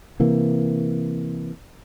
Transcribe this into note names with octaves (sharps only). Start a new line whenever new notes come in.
C3 E3 A#3